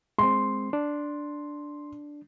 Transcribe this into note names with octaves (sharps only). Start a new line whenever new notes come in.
G#3 C4 C6
D4